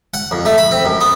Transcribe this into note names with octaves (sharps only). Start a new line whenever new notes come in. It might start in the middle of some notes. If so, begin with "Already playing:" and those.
F#5
F2
A3
B5
C4
F#2
B3